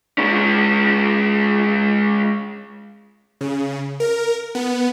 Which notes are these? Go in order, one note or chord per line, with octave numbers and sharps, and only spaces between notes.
G#3 C#4
C#3
A#4
B3